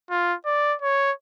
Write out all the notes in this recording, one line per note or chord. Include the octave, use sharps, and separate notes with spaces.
F4
D5
C#5